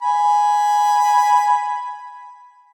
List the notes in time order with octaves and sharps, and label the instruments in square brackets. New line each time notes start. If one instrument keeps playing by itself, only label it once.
[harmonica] G#5 B5